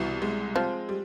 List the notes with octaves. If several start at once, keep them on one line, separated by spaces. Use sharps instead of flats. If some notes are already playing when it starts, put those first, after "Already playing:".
Already playing: C2 B2 E3
G#3
F3 C4
G3